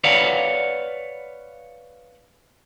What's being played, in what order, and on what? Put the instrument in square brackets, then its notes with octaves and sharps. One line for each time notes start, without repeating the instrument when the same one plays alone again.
[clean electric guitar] B4 C#5 D5 F5 F#5